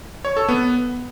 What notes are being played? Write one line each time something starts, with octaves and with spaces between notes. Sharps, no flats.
C#5
A4
B3